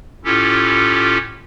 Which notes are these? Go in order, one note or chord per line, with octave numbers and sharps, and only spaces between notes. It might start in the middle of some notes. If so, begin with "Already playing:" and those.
A2 C#4 E4 F4 G4 A4